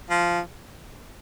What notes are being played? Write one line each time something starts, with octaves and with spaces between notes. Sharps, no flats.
F3